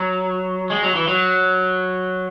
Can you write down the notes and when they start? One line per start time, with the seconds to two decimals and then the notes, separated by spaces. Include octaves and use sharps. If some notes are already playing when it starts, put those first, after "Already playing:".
Already playing: F#3
0.70 G#3
0.83 F#3
0.95 E3
1.08 F#3